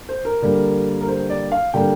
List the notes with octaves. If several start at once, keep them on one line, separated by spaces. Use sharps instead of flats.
C5
A#4
D3 G3 A#3
A#4
C5
D5
F5
D3 G3 A#3 G5